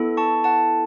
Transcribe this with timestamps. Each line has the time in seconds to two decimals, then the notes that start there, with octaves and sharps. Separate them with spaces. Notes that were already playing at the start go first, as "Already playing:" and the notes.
Already playing: B3 E4 A4
0.17 A5 C#6
0.44 F#5 A5